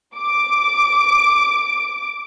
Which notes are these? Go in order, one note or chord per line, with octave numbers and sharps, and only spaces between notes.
D6 D7